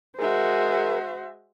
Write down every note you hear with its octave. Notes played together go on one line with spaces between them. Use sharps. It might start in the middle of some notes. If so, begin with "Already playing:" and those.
G#3 F#4 G#4 A#4 C5 E5